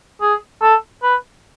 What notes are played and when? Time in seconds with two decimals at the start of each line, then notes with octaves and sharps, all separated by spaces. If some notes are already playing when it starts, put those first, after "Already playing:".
0.21 G#4
0.62 A4
1.02 B4